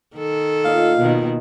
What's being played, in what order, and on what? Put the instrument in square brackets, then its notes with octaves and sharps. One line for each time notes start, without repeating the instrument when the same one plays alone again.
[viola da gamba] D#3 A4
[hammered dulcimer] A#2 D#5 [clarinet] F5
[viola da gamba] B2 D#3